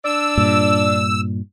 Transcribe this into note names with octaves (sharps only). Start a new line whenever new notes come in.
D4 D5 E6
G2 A#2